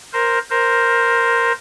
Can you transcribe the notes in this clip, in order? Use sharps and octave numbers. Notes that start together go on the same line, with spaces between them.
A#4 C5
A#4 C5